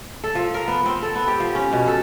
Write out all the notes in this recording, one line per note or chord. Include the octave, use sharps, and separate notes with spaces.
A4
F3
A#4
B3
C4
A4
B3
G4
F3
C#4
B2
A4